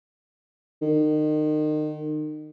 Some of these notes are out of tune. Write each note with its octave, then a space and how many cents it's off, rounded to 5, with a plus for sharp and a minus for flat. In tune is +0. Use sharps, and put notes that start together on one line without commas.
D#3 -30